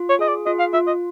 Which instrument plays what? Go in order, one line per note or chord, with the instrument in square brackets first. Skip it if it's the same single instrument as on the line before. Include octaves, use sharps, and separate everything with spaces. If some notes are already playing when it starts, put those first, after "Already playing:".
Already playing: [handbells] F4
[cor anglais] C#5
[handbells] G#4 [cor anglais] D#5
[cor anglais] D5
[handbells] F4 [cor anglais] D#5
[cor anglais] F5
[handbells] F4 [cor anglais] E5
[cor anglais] D#5